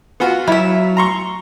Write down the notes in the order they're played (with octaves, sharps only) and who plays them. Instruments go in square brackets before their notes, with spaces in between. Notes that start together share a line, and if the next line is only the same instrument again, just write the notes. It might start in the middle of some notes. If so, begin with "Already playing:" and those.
[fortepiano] B3 F4 F#4
[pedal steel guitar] F#3 [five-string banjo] E4 E5
[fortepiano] A#5 C6 C#6